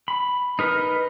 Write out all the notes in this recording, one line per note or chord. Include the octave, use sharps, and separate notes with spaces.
B5
D#4 A#4 B4